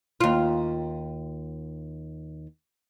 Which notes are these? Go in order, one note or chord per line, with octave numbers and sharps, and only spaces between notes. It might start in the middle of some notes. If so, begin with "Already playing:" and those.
D#2 F4